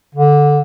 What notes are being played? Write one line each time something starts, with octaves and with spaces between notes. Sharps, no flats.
D3